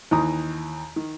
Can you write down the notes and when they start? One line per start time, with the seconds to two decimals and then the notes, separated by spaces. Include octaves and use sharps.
0.11 D#2 D#3 E3 A#5 D#6
0.96 D#3